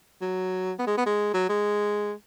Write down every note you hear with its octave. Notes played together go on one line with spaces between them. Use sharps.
F#3
B3
G#3
B3
G#3
F#3
G#3